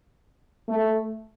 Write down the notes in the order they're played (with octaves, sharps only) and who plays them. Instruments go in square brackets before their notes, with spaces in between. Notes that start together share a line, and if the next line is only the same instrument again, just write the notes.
[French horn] A3